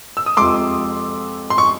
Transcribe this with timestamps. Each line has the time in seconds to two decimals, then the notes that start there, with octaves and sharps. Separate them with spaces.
0.17 E6
0.26 D#6
0.37 F2 C3 F3 G#3 C6 D6
1.50 C6
1.58 C#6